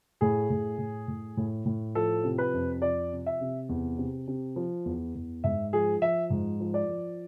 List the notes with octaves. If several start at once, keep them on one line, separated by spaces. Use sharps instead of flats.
A2 G#4
A2
A2
A2
A2
A2
F3 A4
C3
B4
F2
F3 D5
C3
E5
C3
E2
C3
C3
F3
E2
E2
G#2 E5
F3 G#4
F3 E5
G#2
F3
D5
F3